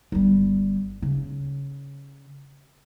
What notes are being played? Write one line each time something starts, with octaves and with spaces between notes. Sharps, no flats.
G1 G3
C#3